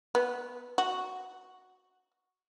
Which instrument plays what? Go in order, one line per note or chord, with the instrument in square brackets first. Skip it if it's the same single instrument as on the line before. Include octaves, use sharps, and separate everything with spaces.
[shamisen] B3
F#4